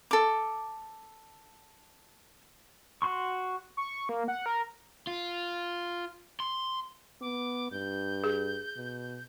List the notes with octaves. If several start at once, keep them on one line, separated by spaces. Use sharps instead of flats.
A4 D6
F#4 C6 C#6
C#6
A#3
F#5
A#4
F4
C6
B3 D6
G2 G6
G#4
B2